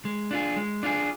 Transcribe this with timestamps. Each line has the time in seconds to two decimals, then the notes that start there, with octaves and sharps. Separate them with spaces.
0.05 G#3
0.31 D4 F4 G#4
0.56 G#3
0.83 D4 F4 G#4